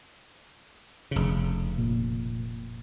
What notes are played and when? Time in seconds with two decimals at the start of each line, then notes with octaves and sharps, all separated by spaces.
1.11 F1 C#3
1.78 A#2